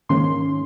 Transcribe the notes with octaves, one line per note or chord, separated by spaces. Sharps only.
G#2 D#3 A#3 C#4 C6